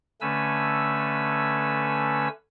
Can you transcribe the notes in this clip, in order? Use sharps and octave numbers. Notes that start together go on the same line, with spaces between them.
D3 A3 C#4 B4 G#5 E6